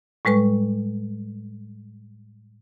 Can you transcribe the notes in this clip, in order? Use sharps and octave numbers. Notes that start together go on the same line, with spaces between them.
A2 G3 G#3 B4 C#6